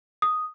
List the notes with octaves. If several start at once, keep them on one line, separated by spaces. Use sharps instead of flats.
D#6